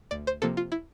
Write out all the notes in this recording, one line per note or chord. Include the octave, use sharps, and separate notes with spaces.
D2 D5
C5
C3 F3 A#3 A4
F4
E4